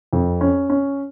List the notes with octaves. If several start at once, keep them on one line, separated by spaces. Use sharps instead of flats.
F2
C#4
C#4